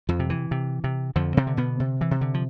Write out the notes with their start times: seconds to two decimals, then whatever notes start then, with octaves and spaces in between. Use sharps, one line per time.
0.09 F2 F3
0.19 C3
0.30 E3
0.51 C3
0.84 C3
1.16 F2 D3 F3
1.37 C3 C4
1.47 D3
1.57 B2 B3
1.80 C3
2.01 E3
2.11 C3
2.21 D3
2.34 F3